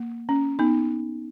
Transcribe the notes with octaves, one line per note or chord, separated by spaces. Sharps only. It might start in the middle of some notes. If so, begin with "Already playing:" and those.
Already playing: A#3
C#4
B3 D#4